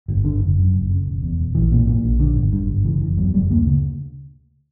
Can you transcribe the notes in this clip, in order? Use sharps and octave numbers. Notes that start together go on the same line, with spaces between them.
G1
D3
F#1
F#2
F#1
C#3
E1
E2
E1
A#1 E3
A#2
A#2
A#1
D3
G1
G2
G1
C#3 E3
F#1 E3
E2 F#3
F#1 G3
D2 A#3
C#3